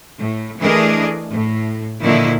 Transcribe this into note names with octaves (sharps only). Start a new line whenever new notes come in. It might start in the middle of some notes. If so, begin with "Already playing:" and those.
A2
E3 A3 D4 G#4 A#4 D#5
A2
A#2 D3 D#3 F3 A#3 E4